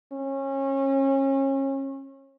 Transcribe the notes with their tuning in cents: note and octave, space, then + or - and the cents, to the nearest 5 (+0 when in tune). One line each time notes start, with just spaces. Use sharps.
C#4 -30